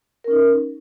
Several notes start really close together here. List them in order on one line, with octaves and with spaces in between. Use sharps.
A#4 C#4 D#4